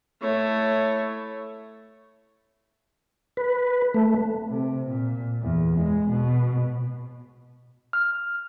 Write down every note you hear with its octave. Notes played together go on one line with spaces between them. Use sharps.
A3 E4 C#5
B4
A3
C3
A#2
E2
G#3
B2
F6